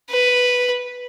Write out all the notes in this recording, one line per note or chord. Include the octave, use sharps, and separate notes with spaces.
B4